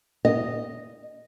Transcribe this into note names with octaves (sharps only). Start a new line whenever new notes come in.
D#5